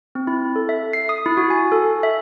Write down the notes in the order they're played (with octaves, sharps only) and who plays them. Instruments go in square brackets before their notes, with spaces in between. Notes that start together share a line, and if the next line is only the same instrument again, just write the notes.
[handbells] C4
E4
A4
E5
C7
D#6
E4
F#4
G#5
A4
E5